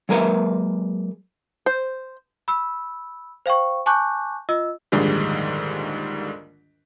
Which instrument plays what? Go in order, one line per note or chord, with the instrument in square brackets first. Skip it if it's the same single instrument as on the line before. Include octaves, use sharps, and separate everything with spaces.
[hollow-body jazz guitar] F#3 G#3 A#3 A#4 B4 E5
[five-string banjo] C5
[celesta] B5 E6
C5 F5 G5 C#6
G#5 A5 C#6 D6 F#6 G6
F4 D#5 E6
[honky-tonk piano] A#1 D#2 G#2 D3 G3 G#3